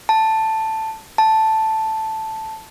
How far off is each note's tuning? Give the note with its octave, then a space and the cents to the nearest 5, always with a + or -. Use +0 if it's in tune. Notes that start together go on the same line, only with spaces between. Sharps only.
A5 +5
A5 +0